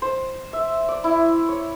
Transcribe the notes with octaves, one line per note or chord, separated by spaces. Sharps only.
C5
E5
D5
E4
C#5